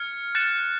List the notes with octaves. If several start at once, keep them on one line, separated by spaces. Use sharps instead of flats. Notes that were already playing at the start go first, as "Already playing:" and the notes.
Already playing: F6 G#6 C#7
F#6 A6 C#7 E7